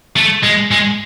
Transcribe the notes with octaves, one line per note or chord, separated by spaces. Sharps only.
A3
G#3
G#3